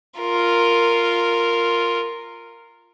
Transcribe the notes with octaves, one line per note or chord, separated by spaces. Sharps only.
F4 A#4